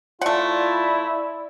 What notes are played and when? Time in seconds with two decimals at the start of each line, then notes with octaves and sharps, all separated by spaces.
0.21 A3 E4 F4 D5 F#5